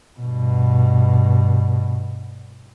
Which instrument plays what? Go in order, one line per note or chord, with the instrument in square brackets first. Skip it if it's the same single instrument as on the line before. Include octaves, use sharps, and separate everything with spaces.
[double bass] G2 B2